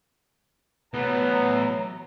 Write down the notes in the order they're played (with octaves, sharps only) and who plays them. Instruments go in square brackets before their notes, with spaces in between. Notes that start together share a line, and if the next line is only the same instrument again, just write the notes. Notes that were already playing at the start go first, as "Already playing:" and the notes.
[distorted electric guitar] E3 A3 [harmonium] F#3 [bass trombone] B3 [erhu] A#5